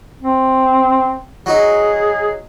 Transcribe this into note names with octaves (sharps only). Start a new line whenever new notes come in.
C4
F#3 D#4 G#4